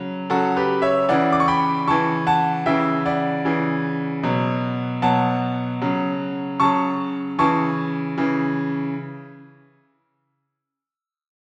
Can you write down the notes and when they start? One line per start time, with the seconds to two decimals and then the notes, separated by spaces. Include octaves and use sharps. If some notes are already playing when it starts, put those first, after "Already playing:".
Already playing: C#3 F#3
0.30 C#3 F#3 F#4 A4
0.56 G4 B4
0.82 C#5 E5
1.09 C#3 E3 D5 F#5
1.32 D6
1.40 C#6
1.48 G5 B5
1.87 C#3 E3 A5 C#6
2.27 F#5 A5
2.66 C#3 E3 E5 G5
3.06 D5 F#5
3.45 C#3 E3
4.23 B2 F#3
5.02 B2 F#3 F#5 A5
5.82 C#3 F#3
6.60 C#3 F#3 A5 C#6
7.39 C#3 E3 A5 C#6
8.18 C#3 E3